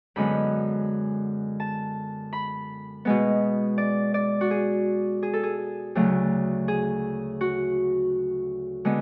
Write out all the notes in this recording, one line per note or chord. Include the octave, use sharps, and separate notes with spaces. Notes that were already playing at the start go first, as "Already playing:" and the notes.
F#2 D3 G#3 B3 B5
A5
B5
B2 G#3 B3
D5
D5
F#4
G#4
G#4
A4
G#4
D2 C#3 F#3 A3
G#4
F#4
D3 G#3 B3